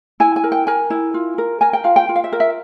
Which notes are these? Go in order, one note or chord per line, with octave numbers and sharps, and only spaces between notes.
E4 G#5
G#5
A#4
G5
A#4 G#5
E4
F4
A#4
A#4 G#5
G5
F4 F5
G5
F4
F5
E5
A#4
E5